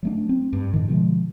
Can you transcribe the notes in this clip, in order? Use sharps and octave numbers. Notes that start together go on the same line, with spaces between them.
F#3 A3 D4
C4
G2
A2 D#3
B2 D3 F3 G#3